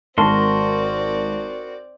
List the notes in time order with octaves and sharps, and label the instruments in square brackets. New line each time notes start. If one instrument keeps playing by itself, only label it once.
[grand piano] G#1 [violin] C4 D5 [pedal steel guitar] F#4 A#4 C6 [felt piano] A5